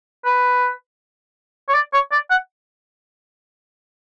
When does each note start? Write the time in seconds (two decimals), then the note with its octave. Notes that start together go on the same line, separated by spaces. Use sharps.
0.25 B4
1.68 C#5
1.74 D5
1.93 C#5
2.12 D5
2.30 F#5